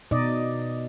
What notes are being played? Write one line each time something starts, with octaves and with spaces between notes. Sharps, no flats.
B2 D#4 D5 D#5